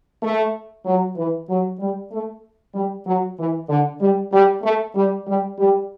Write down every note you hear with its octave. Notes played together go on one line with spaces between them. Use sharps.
A3
F#3
E3
F#3
G3
A3
G3
F#3
E3
D3
G3
G3
A3
G3
G3
G3